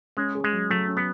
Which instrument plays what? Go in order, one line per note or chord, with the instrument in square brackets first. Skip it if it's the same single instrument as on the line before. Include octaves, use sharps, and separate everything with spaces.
[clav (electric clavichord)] G#3 [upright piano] C#4
[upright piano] G#4
[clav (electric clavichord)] G#3
[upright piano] F#3
[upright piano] F#3 [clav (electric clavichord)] A3
[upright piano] C#4
[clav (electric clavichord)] B3